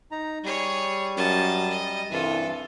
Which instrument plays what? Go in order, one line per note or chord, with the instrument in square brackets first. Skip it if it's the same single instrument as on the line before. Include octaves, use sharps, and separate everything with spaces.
[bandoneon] D#4 A#5
[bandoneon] G3 [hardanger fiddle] G#4 C#5
[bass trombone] F#2 [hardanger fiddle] D#5 A5
[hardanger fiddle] D#5
[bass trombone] C2 [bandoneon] G2 E3 [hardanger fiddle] F4 A4